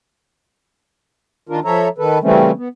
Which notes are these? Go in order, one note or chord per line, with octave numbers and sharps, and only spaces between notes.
D#3 D4 F4 A#4
F3 A4 C#5 E5 A#5
D#3 A4 B4
C#3 E3 G3 A3 C4 C#4
B3